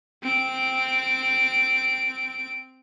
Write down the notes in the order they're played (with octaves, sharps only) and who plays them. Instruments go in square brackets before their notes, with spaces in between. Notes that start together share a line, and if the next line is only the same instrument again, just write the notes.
[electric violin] C4 D7